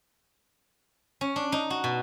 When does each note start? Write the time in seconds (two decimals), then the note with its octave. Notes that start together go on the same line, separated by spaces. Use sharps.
1.21 C#4
1.36 D4
1.52 D#4
1.70 F#4
1.84 B2